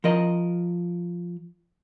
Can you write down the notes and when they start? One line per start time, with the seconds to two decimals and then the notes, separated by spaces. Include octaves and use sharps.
0.04 F3 A#4 D#5